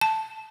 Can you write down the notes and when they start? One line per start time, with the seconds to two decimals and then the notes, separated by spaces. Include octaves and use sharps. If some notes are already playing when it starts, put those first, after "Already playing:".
0.01 A5